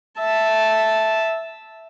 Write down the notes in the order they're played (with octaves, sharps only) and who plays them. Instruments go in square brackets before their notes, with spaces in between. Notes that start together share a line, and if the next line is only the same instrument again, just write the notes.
[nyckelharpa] E5 A5